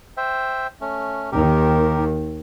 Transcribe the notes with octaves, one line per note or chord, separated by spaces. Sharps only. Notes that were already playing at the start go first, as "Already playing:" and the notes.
C5 E5 G5
A3 C#4
D#2 D#3 G4 A#4